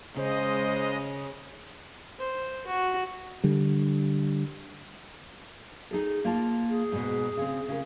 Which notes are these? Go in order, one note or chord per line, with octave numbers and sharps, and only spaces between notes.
C#3 G#3 C5 D#5
C5
F#4
D3 G3
D#4 G#4 A4
A#3 F4 A5
G#4
G#2 B2
C#3 C4
C#3 F#4 A#4